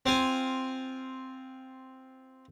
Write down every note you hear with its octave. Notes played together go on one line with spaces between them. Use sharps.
C4 F4 G#5